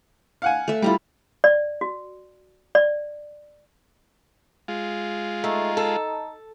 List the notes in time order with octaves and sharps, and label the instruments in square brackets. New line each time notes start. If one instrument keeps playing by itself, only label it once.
[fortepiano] F5 F#5 G#5
[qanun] A3 E5
[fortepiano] G3 F4 [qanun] E4 A#5 D6
[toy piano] D5
F#4
D5
[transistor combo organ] G#3 F4
[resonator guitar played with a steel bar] A3 [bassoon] D#4
[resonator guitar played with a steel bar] A4